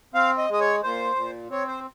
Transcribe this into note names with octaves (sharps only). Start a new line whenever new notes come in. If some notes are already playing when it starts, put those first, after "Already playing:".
C4 F5
D#5
G#3 D#5
C#5
A#2 C5
A#2
C4 C#5
C5